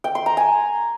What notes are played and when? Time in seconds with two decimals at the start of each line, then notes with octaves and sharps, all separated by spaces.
0.04 G5
0.15 C6
0.26 A#5
0.37 G#5